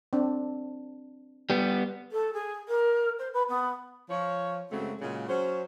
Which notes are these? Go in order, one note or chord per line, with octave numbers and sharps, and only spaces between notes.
C4 D4
G3 B3
A4
G#4
A#4
C5
B4
B3
F3 C#5
F#2 C#3 F#3 G#3 A3 C4
A#2 C#3 F#3 G#3
F#3 C#4 C5